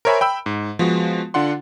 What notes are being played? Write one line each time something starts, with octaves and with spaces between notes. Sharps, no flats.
A#4 C5 C#5 E5 G#5 B5
G5 B5 E6
G#2
F3 G#3 B3 F#4
D3 D4 F4 F#5 C6